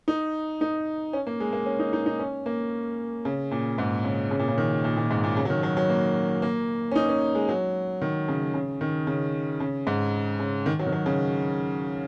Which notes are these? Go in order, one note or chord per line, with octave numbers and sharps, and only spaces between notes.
D#4
D#4
C#4
A#3
G#3
A#3
C#4
D#4
D#4
D#4
C#4
A#3
C#3
A#2
G#2
C#3
C#3
A#2
C#3
D#3
A#2
A#2
G#2
A#2
C#3
F#3
D#3
F#3
F#3
A#3
A#3
C#4
D#4
C#4
G#3
F#3
D#3
C#3
C#3
D#3
C#3
C#3
G#2
C#3
D#3
F#3
D#3
F#3
C#3